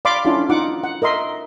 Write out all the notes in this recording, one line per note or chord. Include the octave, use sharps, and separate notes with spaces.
D5 F5 B5 C6 D6
C#4 D4 E4 F4
D#4 F4 F#5 D6
F#5
A#4 D#5 E5 C6